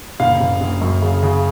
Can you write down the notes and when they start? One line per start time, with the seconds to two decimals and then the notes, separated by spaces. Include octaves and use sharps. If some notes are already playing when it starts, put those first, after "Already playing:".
0.20 F#1 F5
0.41 F#1
0.61 F#1
0.81 F#2
1.02 C#3
1.23 C#3